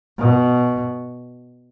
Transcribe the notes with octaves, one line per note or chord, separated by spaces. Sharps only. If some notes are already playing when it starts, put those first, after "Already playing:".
B2